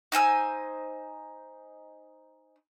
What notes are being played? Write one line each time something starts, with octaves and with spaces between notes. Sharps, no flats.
D#4 C5 G#5 E6